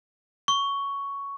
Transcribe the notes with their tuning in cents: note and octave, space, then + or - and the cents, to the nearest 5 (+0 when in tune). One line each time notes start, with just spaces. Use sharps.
C#6 +10